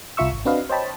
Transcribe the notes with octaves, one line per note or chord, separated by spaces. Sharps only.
C2 F4 E5 C#6 E6
G#1
C4 D4 F#4 B4 D#5 F5
C5 C#5 D#5 G5 A5 B5